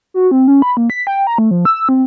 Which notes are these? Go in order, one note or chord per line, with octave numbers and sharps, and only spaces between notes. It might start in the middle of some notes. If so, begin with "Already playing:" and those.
F#4
C4
C#4
B5
A#3
B6
G5
A#5
A3
F3
E6
C4